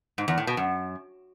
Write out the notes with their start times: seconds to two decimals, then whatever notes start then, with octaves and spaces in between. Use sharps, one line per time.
0.18 G#2
0.28 E2
0.38 A2
0.47 B2
0.57 F#2